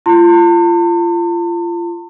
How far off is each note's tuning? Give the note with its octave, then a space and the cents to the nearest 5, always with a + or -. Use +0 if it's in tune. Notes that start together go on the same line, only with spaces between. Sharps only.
F4 -30 A5 +45 C6 +10